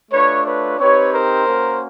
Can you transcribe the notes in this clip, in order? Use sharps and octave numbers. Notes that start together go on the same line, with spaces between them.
A3 D4 F4 B4 C#5
B4 C#5
C4 D#4 G4 B4 C#5
A#4 C5
A#3 C#4 F#4